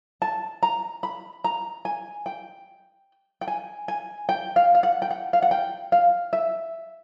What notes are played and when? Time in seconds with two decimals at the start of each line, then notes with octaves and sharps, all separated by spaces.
0.22 A5
0.63 A#5
1.03 B5
1.44 A#5
1.85 G#5
2.26 G5
3.41 G5
3.48 G#5
3.88 G#5
4.29 G5
4.56 F5
4.75 F5
4.83 F#5
5.02 G5
5.11 F#5
5.33 F5
5.42 F#5
5.51 G5
5.92 F5
6.33 E5